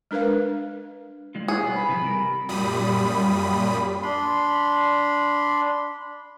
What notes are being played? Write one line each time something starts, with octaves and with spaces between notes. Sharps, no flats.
G#3 D4 A#4 B4 F5
G3 G#3 F4
G#4 C5 C#5 F#5
B2 G3 B3
B5
C3 E3 F3
C3 G3 A#4
F#2 A#2 G3 B5 D#6
D4 B5 C6